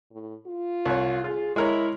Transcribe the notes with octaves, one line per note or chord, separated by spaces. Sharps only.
A2
F4
C2 C#5
F4 G#4
G#3 E4 A#4 C#5